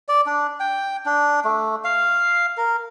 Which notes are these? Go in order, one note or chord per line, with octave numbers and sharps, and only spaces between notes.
D5
D4
G5
D4
A3
F5
A#4